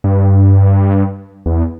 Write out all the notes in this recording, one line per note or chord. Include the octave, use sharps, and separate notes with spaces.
G2
E2